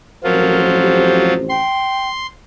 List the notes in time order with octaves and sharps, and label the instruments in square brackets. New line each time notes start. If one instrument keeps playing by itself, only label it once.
[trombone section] A1 F2 C5 [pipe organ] F3 F#3 F4 [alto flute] A#4
[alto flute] G4
[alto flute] G5 [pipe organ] C6